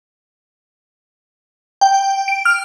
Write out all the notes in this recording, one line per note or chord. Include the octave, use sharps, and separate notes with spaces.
G5
D7
F6